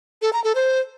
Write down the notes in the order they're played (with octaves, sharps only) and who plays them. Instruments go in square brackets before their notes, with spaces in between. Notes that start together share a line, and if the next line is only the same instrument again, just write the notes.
[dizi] A4
A#5
A4
C5